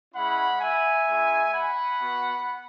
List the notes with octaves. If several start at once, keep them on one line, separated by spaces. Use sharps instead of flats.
G#3 C#4 E4 F#5 B5
E5 G#5
G#3 C#4 E4
F#5 B5
B3 F#4